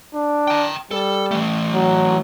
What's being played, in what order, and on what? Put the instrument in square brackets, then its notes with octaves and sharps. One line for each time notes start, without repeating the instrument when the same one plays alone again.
[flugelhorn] D4
[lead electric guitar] G5 A#5
[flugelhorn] G3 [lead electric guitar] A4
[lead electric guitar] E3 A3
[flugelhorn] F#3